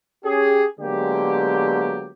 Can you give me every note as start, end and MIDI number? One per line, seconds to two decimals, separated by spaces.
0.24 0.65 61
0.24 0.65 67
0.24 0.65 68
0.79 2.10 50
0.79 2.10 54
0.79 2.10 56
0.79 2.10 58
0.79 2.10 59
0.79 2.10 67